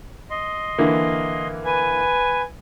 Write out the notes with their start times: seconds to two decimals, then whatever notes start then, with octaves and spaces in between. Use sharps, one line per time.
0.31 D#5 C6
0.78 D3 E3 A#3
1.65 B4 G#5